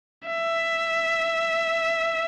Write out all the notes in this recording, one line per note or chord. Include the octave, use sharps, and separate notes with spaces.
E5